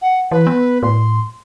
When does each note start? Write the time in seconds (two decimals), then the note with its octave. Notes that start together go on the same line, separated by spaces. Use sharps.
0.02 F#5
0.31 E3 B4
0.47 B3
0.83 A2 C6